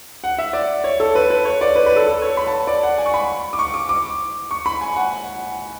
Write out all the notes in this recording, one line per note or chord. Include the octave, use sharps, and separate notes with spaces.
F#5
E5
D5
C#5
A4
B4
B4
C#5
D5
B4
B4
A4
A4
C#5
B5
A5
D5
F#5
G#5
C#6
B5
D6
C#6
D6
D6
C#6
B5
G#5
F#5